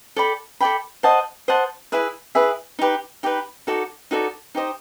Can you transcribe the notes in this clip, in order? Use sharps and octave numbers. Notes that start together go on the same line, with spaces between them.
A4 D5 G5 B5
A4 D5 G5 B5
C5 D#5 F#5 A5
C5 D#5 F#5 A5
E4 G#4 B4 E5
E4 G#4 B4 E5
D#4 G4 B4
D#4 G4 B4
D#4 F#4 A4 D5
D#4 F#4 A4 D5
D#4 G4 C5 D#5